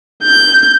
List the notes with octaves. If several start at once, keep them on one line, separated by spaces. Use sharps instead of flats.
G6